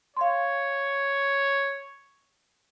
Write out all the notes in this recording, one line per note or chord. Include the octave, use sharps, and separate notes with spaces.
C#5 F5 C6